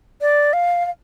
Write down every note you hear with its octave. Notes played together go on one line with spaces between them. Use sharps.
D5
F5
F5